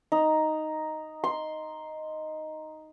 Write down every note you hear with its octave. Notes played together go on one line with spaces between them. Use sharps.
D#4
C6